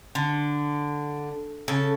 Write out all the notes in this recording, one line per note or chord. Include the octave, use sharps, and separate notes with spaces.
D3
C#3 A4